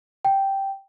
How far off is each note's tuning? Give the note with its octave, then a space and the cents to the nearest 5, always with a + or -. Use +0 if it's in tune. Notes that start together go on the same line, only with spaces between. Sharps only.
G5 -5